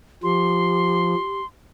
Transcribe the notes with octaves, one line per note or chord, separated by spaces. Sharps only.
F3 G4 C6